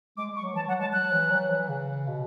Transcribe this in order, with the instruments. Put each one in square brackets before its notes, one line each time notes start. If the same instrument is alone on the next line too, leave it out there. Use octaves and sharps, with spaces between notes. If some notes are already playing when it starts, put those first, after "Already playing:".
[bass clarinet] G#3 [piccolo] D6
[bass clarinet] G#3
[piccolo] C#6
[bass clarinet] F#3
[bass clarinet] E3 [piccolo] A5
[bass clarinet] F#3 [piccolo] F#5
[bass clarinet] G#3 [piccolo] A5
[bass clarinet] F#3 [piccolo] F#6
[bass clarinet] E3
F#3
E3
C#3
B2